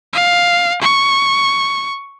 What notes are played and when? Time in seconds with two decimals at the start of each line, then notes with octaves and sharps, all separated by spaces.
0.13 F5
0.82 C#6